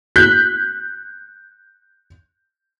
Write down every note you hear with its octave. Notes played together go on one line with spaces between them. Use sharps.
F#6 G6 B6